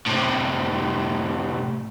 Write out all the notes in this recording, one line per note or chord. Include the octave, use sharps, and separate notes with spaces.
A2 C3